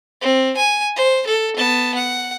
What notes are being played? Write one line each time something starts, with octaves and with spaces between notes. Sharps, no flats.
C4
G#5
C5
A4
B3 A5
F#5